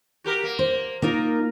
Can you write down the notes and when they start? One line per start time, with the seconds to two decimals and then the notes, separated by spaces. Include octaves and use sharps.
0.24 F#4 G4 A#4
0.44 A#3
0.59 C5
1.02 A#3 D#4 F4 A#4